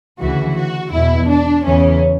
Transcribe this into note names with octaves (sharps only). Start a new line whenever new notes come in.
D2 C#3 E3 F#4
F#4
E2 B2 E4
D4
E2 C#3 E3 C#4